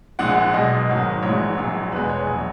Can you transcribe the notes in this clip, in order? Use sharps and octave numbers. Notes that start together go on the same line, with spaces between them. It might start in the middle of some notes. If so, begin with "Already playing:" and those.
A#1 A#2 G#3 F#5
F#5
B1 B2 G#3 D#5
G#1 G#2 D#3 F#3
A#1 G#2 E3 G#3 C#5
A#1 A#2 F#3
E2 B2 G#3 B4
C#5
A#1 F#3